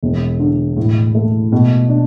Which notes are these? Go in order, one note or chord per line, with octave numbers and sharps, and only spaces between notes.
E1
D3
A2
A3
B2
D4